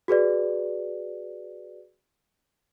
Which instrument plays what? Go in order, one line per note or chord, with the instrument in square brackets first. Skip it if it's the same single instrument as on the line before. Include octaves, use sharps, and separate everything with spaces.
[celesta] F#4 G#4 B4 D5